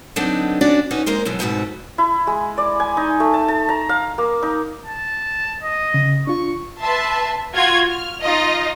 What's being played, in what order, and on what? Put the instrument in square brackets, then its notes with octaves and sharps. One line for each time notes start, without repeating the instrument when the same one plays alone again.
[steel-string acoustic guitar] D3 F#3 B3 C4 D4 D#4
C#4 D4 F#4 D5
C#4 D#4 F#4 B4 C#5
G#3 A#3 A#4 C5
F#2 B2 E3 F#3
F2 G#2 B2 A3 F#4 B4
[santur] E4
G#3
D5
G#5
D#4
A3
A5
A5
A#5
F5
A#3
D#4
[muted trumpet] A5
D#5
[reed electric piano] C#3
[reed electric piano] D4 F4 [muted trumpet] C#6
[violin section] B4 E5 A5 C6
F4 F#4 G#6
F6
D#4 F4 D#5